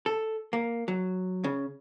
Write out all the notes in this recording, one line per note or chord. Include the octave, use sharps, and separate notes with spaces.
A4
A#3
F#3
C#3